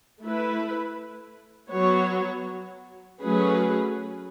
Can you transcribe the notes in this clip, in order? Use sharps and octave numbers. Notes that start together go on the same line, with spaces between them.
A3 E4 B4
F#3 B3 F#4 C#5
F#3 A3 C#4 G#4 B4